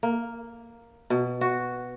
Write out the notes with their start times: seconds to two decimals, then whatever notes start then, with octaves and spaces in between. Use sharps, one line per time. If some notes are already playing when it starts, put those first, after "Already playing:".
0.03 A#3
1.10 B2
1.41 F#4